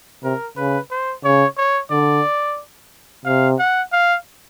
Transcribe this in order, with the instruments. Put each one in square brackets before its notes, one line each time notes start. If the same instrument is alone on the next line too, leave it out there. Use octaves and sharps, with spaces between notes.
[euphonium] C3 [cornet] A#4
[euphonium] C#3 [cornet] B4
[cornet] C5
[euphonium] C#3 [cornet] C#5
[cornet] C#5
[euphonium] D3 [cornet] D5
[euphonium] C3 [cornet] F5
[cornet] F#5
F5